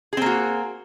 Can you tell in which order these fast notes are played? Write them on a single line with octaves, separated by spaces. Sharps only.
G#4 C4 A#3 F#4